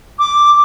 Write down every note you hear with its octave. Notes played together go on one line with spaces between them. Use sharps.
D6